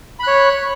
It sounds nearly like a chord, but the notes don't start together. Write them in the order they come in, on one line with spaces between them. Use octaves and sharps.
B5 F#6 C#5